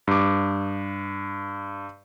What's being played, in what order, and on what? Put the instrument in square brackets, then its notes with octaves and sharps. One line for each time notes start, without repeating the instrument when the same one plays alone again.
[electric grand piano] G2 D6